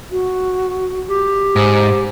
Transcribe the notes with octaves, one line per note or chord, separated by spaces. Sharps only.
F#4
G4
G#2 C5